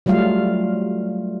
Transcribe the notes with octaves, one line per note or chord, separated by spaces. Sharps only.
F#3 G3 A3 F4 F5